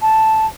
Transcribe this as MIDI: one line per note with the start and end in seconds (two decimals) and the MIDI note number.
0.02 0.46 81